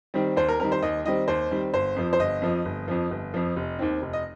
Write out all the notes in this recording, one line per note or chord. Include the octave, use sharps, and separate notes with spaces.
D#3 G3 C4
D#2 C5
A#4
D#3 G3 C4 A#4
C5
D#2 D#5
D#3 G3 C4 D#5
D#2 C5
D#3 G3 C4
G1 C5
F2 F3
C5
G1 D#5
F2 F3
G1
F2 F3
G1
F2 F3
F1
D#2 D#3 C4
F1
D#5